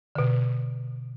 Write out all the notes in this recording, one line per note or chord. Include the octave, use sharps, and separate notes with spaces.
B2 D3